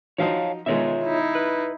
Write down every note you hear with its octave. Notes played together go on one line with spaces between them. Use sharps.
F3 F#3 D#4 C#5 F5 A5
B2 D#3 G#3 F4 C#5 E5
D#4 E4
B4